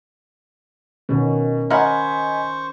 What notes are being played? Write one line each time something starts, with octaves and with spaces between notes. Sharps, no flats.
B2 D#3 C#4
A#4 C5 D#5 F#5 G#5 B5 C#6